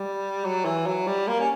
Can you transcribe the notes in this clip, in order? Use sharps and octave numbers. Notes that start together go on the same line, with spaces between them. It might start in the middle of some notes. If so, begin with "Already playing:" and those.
Already playing: G3
F#3
E3
F#3
G3
A#3
C#4